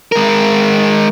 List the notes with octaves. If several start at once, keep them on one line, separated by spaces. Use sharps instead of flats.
G#3 A#4